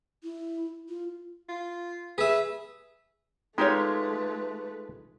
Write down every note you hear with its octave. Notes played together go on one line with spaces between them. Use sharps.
E4
F4
F4
G#4 B4 E5
G#3 A3 D#4 F4 G4 B4 C#5 G5